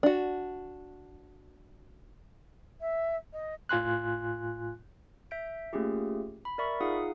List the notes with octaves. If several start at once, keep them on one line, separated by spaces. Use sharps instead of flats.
D4 F#4
E5
D#5
A2 F4 G#5 C6 F#6
E5 G6 D7
A3 A#3 C#4 F4 G4 G#4
B5
A#4 D5 E5 B5 C#6
D#4 F4 G#4 F5 F#5 D#6